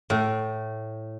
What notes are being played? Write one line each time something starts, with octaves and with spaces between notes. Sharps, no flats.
A2